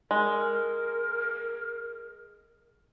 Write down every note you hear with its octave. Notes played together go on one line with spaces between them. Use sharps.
G#3 A#4